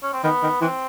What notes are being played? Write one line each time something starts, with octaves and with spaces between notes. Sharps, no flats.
C#4
C4
D#3 B3
D#3
E3 C4